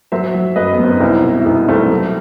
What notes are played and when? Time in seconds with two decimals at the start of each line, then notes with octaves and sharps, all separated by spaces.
0.12 F#3 C5 E5
0.34 F#3
0.56 F#2 B4 D#5
0.73 B3
0.79 F#2 C4
0.93 D#4
1.00 C2 C4 E4
1.24 B2
1.39 E4
1.45 C2 B3 D#4
1.68 C2 A3 C4
1.90 F#3